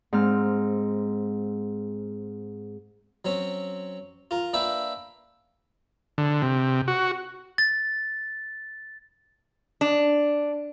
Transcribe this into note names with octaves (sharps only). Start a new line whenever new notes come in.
G#2 C4 F6
F#3 C4 C#4
F4 A#4
A#3 D4 B4 E5 G5
D3
C3
F#4
A6
D4